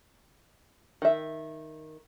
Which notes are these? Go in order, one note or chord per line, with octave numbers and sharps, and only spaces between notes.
D#3 E5